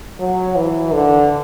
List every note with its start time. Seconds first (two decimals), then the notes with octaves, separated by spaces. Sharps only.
0.20 F#3
0.56 E3
0.93 D3